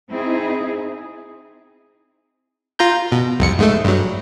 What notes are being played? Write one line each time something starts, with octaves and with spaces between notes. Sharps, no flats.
C4 D#4 E4 G#4
F4 A#5 G6
B2
C2 F2 C#7
G#2 G#3 A3
G2 F#3